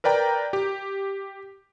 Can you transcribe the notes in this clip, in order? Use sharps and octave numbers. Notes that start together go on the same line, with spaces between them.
A#4 B4 D5 G5 A#5
G4